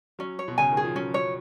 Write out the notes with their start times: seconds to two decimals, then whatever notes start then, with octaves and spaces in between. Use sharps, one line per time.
0.19 F#3 C#4
0.39 C#5
0.48 B2
0.58 C#3 G#5
0.71 D#3
0.77 G#4
0.84 F3
0.95 F#3 C#4
1.14 C#5